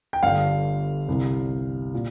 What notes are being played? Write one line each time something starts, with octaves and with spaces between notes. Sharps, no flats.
G5
G1 G2 D3 F5
C2 C3
A#2